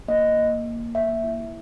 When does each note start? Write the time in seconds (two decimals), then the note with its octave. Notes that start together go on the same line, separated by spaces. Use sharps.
0.08 A#3 D#5
0.37 A#3
0.66 A#3
0.95 A#3 E5
1.24 E4